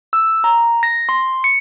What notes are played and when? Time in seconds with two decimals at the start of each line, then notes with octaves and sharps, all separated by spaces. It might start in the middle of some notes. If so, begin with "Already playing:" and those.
0.13 E6
0.44 A#5
0.83 A#6
1.09 C6
1.44 C#7